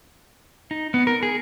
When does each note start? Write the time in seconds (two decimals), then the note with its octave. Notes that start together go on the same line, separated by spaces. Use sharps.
0.71 D#4
0.94 B3
1.07 A#4
1.23 G#4